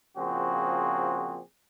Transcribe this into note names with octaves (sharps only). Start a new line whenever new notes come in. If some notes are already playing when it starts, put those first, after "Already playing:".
A#2 C#3 F3 C4 F#4 G#4